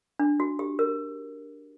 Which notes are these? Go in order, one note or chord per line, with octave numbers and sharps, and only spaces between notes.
D4
F#4
G4
A#4